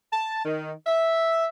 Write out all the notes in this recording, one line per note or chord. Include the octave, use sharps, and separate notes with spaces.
A5
D#3
E5